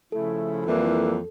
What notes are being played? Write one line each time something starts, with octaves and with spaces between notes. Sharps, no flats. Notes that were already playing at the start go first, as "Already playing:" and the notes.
C#3 F3 A3 E4 A4
F2 E3 G3 A#3 E4